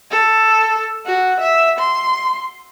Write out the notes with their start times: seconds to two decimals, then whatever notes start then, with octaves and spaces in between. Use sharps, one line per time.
0.11 A4
1.06 F#4
1.40 E5
1.78 C6